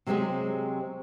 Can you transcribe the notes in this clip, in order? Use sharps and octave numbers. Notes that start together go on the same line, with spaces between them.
C3 F#3 G#3 C4 G4 G#4